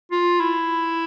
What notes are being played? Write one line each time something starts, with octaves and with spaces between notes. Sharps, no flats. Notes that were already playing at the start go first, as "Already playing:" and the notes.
F4
E4